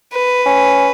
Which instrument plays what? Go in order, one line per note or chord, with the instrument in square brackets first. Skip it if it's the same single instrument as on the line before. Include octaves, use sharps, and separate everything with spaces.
[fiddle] B4
[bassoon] C#4